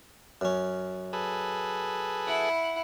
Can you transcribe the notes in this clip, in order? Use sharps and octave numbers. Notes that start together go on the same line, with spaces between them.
F#2 C#4
G#4 A4 B4
E4 F#5